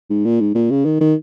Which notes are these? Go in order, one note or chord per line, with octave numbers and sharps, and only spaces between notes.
G#2
A#2
G#2
A#2
C#3
D#3
D#3